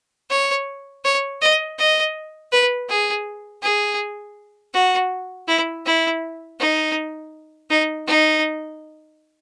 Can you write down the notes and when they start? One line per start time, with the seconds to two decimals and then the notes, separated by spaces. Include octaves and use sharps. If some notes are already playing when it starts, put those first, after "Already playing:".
0.31 C#5
1.05 C#5
1.42 D#5
1.79 D#5
2.52 B4
2.89 G#4
3.63 G#4
4.74 F#4
5.48 E4
5.86 E4
6.60 D#4
7.71 D#4
8.07 D#4